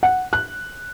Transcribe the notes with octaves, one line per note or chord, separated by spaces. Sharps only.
F#5
F#6